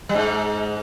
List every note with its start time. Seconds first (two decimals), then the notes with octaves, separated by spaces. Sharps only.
0.09 G3
0.14 G#2 G#3